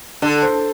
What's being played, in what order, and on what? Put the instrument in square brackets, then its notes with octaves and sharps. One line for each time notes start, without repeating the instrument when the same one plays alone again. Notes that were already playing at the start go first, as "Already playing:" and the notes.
[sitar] D3 [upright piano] A4
[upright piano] C5